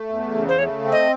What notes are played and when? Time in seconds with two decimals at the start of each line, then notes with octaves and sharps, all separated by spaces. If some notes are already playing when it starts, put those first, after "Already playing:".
Already playing: A3
0.10 E2
0.34 C#3
0.49 C5
0.59 A3 C#5
0.84 C4
0.92 D#5